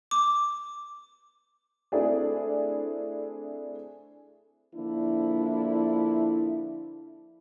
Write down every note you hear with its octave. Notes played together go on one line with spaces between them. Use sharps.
D6
A3 C4 D4 E4 G#4 D5
D3 F3 A#3 D4 E4